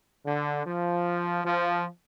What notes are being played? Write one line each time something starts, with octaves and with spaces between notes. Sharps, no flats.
D3
F3
F3